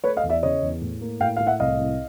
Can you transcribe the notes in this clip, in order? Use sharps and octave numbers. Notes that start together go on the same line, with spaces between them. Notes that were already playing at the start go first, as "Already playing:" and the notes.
A3 B4 C#5
D#5 F5
E2
D5 E5
C#3 C#5 D#5
E2
A2
A#3
A2 F5 G5
A2 F5
E5 F#5
C2 D#5 F5
C2